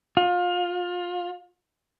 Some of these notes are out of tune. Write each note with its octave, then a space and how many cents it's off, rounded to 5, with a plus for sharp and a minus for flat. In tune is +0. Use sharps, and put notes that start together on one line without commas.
F4 +25